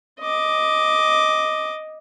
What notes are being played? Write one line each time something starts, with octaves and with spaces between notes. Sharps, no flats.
D#5 D6